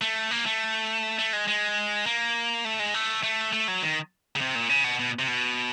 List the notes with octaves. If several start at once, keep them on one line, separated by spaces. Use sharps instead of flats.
A3
A#3
A3
A3
G#3
G#3
A#3
A3
G#3
A3
A3
A3
F#3
D#3
C#3
C3
A#2
C#3
B2
B2
C3
B2